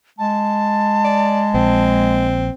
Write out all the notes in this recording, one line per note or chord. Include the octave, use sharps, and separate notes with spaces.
G#3 A5
D5
A#1 C4